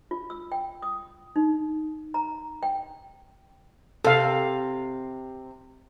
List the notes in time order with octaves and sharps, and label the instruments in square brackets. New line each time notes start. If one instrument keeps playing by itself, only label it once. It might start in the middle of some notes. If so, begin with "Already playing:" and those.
[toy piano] F4
E6
G5
D#6
D#4
A#5
G5
[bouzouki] C3 [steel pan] A4 F5